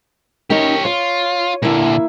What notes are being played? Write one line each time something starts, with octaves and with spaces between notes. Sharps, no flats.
C#4 D#4 G4 A#4 C#5
F4 C#5
A#2 D3 A#3 E4